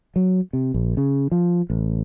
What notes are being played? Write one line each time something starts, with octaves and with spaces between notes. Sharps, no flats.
F#3
C3
A#1
C#3
F3
A1